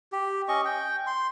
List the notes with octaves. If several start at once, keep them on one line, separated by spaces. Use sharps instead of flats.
G4
C#4 D#5 C#6
G5
C6